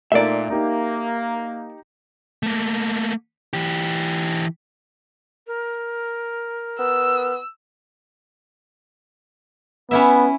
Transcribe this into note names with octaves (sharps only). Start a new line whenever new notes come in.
A#2 A3 A#3 D#4 D5 E5
A#3 D#4 G4
A3 A#3
E3 G4
A#4
B3 E6
B3 C#4 E4 E5